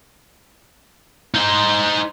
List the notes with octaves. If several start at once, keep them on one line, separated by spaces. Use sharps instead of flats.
D#4 C5